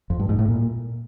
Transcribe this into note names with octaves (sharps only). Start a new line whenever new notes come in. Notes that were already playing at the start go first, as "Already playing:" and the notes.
F2
G2
G#2
A2
A#2